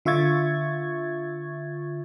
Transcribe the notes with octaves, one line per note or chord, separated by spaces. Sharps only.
D3 F4 E5 C#6 G#6 A6